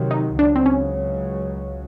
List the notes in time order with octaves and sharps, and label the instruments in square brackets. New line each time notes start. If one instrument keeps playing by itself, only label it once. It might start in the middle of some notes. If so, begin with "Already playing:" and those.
Already playing: [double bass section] C3 D#3 F#3
[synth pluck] D#4
[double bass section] C#2 C#3 F#3 [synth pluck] D4
[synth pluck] C4
C#4